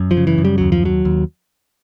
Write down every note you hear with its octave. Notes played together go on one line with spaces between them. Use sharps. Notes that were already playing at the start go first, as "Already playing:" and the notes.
Already playing: F#2
F3
C#3
E3
F#2
G3
D#2 F#3
F3
D#2 F#3
D#2